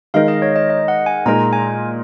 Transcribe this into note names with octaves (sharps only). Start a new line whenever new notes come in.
D#3 G#3 D#4 A#4 F5
D#5
C#5
D#5
D#5
F#5
G#5
A#2 G#3 D#4 A#4 A#5
G#5